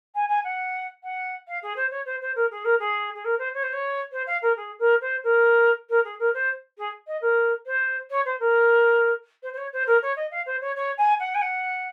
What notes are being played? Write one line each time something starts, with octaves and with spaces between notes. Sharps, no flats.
G#5
G#5
F#5
F#5
F5
G#4
C5
C#5
C5
C5
A#4
G#4
A#4
G#4
G#4
A#4
C5
C#5
C5
C#5
C5
F5
A#4
G#4
A#4
C5
A#4
A#4
G#4
A#4
C5
G#4
D#5
A#4
C5
C#5
C5
A#4
C5
C5
C#5
C5
A#4
C#5
D#5
F5
C5
C#5
C#5
G#5
F#5
G#5
F#5